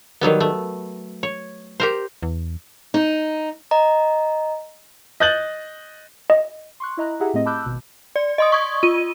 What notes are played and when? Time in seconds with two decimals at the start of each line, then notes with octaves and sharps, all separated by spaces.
0.21 D#3 F#3 G3 B3
0.40 A3
1.23 C#5
1.80 G4 A#4 C5
2.23 E2
2.94 D#4
3.71 D#5 A#5
5.20 D#5 F#6 G6 A6 F#7
6.30 D#5
6.80 C6 C#6 F#6
6.97 E4 D#5 A#5 F#6
7.20 E4 G4 G#4 E5 F#5 A#5
7.33 A2 A3 C4 D#5
7.46 A5 B5 D6 E6 F#6 G6
7.65 G#1 B2
8.16 D5
8.38 D#5 C6 D#6
8.52 C#6 D#6 G#6
8.83 F4 D#7